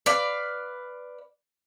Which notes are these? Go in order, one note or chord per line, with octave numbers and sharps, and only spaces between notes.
B4 D5 F5